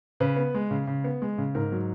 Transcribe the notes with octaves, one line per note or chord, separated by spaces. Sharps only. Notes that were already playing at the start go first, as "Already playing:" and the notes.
C#3 B4
B3
G#3
C#3
C#3
B3
G#3
C#3
G#2 A#4
F#3